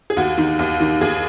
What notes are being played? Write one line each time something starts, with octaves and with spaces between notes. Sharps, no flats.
G#4
D#2 F#4
D#3
D#2
D#3
D#2 G#4